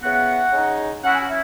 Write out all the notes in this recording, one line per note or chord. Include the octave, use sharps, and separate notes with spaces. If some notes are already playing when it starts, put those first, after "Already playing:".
C#3 E3 B3 F#4 F#5
C#3 G#3 D#4
F#3 C#4 E4 F#4 F#5
G#5
F#5
E4 E5